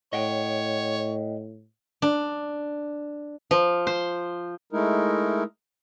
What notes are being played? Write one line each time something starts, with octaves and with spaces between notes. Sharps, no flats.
A2 C#5 D#5 F#5 G5
D4
F3
C5
G#3 A3 D#4 E4 A#4